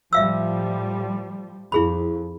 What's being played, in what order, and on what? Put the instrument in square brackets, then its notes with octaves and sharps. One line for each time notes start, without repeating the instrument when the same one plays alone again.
[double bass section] A2 F3 G3 [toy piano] E5 F5 E6
[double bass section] F2 [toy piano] E4 G#4 B5